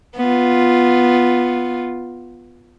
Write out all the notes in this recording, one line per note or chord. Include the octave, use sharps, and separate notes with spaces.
B3 F4